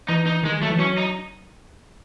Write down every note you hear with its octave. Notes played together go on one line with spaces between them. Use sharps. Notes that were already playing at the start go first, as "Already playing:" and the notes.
E3 D#4
E3 D#4
D#3 G#3
F#3 A3
E3
F#3 C#4
D#4